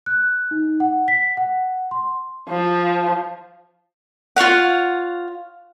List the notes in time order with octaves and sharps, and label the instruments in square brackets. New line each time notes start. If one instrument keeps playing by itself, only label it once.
[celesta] F#6
D#4
F#5
B6
F#5
C6
[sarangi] F3
[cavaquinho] F4 C#5 F5 F#5